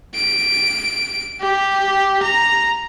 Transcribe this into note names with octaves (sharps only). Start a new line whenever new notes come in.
D7
G4
A#5